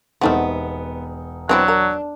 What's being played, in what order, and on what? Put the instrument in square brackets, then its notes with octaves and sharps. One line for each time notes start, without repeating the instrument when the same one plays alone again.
[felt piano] E1 D#4 F#5 [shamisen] G3 A3 C4 [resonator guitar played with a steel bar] B3
[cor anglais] F#3 [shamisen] B3 C4 E4 [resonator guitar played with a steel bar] D4
[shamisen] A#4